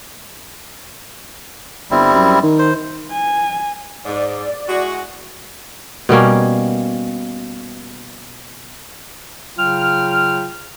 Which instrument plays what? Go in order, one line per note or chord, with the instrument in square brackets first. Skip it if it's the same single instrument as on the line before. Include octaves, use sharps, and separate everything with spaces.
[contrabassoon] G1 [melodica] G3 C4 E4
[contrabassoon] F#2
D#3
[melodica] C5
[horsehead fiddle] G#5
[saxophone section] G#2 [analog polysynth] D5
[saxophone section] G#3 E4 F#4
[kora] B2 G3 A#3 C#4
[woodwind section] C#3 F#3 F4 G5 F6